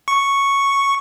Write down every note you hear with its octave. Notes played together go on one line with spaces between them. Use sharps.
C#6